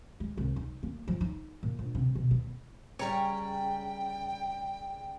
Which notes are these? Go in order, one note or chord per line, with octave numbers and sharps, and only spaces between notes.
G#3
C2
D#4
A#3
F3
D#4
A#2
A#1
C3
B2
B3
C#3 G3 C#5 G5 A#5 C#6